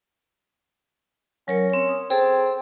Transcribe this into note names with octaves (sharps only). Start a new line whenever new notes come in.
F#3 C#4 A#4 C#5
C4 C#5
D#6
C4 G#4 A4 A5